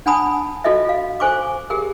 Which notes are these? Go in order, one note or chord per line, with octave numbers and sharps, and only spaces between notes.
D4 F#5 G#5 A5 B5 D#6
F4 F#4 A4 D#5 E5
F5
A4 C5 G#5 C#6 D6
G4 G#4 A#4